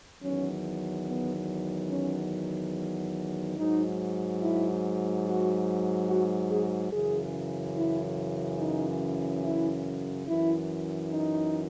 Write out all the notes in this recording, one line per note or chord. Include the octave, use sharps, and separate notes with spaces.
E2 D#3 F#3 C#4
B3
C#4
G#2 F#3 D#4
E4
F#4
F#4
G#4
F#2 C#3 E3 G#4
E4
D#4
E4
F#2 E3 E4
D#4